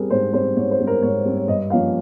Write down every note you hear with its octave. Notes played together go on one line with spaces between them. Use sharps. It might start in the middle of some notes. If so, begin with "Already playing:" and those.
Already playing: G3 C4 G#4 A#4
G#2 C5
G3 C4 C5
G#2 C#5
C5
G3 C4
A#4
G#2 C#5
G3 C4
C#5
G2 D#5
F3 A#3 C#4 F5